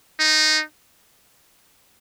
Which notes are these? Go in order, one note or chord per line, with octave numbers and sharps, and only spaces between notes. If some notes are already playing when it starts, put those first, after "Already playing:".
D#4